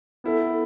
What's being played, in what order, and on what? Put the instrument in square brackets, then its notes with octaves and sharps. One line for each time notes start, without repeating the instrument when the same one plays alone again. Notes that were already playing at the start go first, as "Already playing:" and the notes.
[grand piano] B3 E4 A4